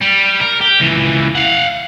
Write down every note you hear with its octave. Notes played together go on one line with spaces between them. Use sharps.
G3
A#4
G4
C#2 E3
F5 F#5